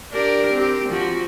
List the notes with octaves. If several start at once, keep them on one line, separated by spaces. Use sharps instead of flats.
D4 G4 A#4
C4 G4
F3 F#4